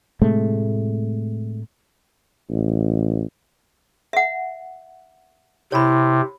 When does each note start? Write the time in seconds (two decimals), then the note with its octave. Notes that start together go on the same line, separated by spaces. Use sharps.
0.22 A2 C3 G#3 A3
2.50 A1
4.13 E5 F#5
5.72 C3 E4 C#5 B5